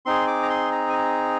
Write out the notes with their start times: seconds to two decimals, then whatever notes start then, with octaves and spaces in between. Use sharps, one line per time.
0.06 C4 D#4 G#4 C6
0.27 D6
0.43 A#5
0.50 C6
0.72 A#5
0.89 G#5
0.94 A#5